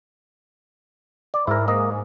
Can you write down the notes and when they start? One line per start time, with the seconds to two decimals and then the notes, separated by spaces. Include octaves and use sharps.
1.34 D5
1.47 G#2 E4 A#4
1.68 A#3 D#5